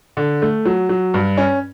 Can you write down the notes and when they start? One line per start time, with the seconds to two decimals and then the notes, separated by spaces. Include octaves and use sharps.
0.17 D3
0.42 A3
0.65 F#3
0.89 F#3
1.14 G2
1.37 C#4